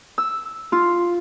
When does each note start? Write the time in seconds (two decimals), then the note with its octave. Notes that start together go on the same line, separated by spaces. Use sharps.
0.18 E6
0.72 F4